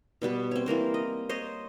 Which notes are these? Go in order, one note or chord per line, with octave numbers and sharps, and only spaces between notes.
B2 G3 B3 B4
C4 C#5
E3 A#3 A#4 C5
D#5
C5 C#5 D#5